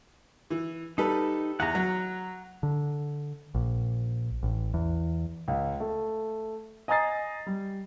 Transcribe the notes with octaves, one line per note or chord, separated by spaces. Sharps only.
E3
G3 D#4 A4 B4
E2 F#5 A#5
F#3
D3
A#1
A1
E2
C#2
A3
D#5 G#5 A#5 D#6 A6 C7
G3